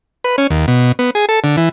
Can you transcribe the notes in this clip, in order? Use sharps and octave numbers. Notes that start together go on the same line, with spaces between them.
B4
C#4
D#2
B2
B3
G#4
A4
D3
E3